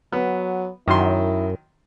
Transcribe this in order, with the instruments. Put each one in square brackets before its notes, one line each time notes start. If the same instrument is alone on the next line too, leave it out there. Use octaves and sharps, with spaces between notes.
[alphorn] F#3 [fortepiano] B3
[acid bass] F#2 [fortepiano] D#3 F#3 C6 [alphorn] E4